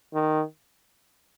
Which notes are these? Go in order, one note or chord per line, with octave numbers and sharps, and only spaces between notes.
D#3